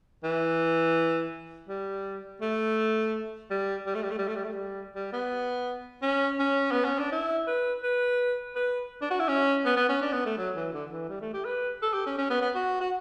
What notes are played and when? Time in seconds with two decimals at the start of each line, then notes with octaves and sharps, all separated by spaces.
0.24 E3
1.68 G3
2.41 A3
3.50 G3
3.86 G3
3.95 A3
4.03 G3
4.11 A3
4.18 G3
4.28 A3
4.35 G3
4.44 A3
4.52 G3
4.95 G3
5.12 B3
6.02 C#4
6.39 C#4
6.72 B3
6.84 C#4
6.99 D4
7.12 E4
7.48 B4
7.83 B4
8.56 B4
9.02 D4
9.10 F#4
9.20 E4
9.28 C#4
9.65 B3
9.77 B3
9.89 C#4
10.02 D4
10.13 B3
10.25 A3
10.38 F#3
10.56 E3
10.73 D3
10.91 E3
11.09 G3
11.21 A3
11.33 G4
11.45 B4
11.82 A4
11.94 G4
12.06 C#4
12.18 C#4
12.30 B3
12.42 B3
12.55 F#4
12.81 F#4